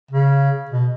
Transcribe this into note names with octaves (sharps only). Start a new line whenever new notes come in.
C#3
B2